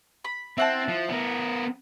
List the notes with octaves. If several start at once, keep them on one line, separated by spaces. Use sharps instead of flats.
B5
C4 E4 F#5 A5
F3
B3 A#4